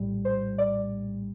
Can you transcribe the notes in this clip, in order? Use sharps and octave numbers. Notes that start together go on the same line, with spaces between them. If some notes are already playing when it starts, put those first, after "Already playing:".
Already playing: A#1 A2 G3
C5
D5